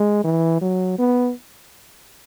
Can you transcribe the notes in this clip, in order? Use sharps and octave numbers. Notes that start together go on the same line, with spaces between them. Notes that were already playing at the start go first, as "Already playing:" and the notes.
Already playing: G#3
E3
F#3
B3